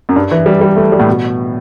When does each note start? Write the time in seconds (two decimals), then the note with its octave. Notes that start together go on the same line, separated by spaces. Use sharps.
0.09 F#2
0.16 G2
0.31 E3
0.46 G3
0.61 G3
0.76 A3
0.92 G3
0.99 A2
1.07 B2